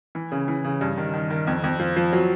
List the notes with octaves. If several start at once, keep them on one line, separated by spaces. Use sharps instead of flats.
E3
C#3
E3
C#3
G2
D#3
D#3
D#3
F2
F2
F3
F3
F#3